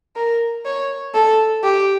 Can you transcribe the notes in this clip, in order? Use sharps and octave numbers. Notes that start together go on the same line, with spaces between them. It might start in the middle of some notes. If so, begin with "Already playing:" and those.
A#4
C#5
A4
G4